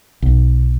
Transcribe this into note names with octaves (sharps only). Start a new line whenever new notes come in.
B1